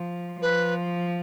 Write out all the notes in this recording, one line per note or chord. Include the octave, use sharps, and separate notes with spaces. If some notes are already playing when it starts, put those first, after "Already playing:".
Already playing: F3
F3 B4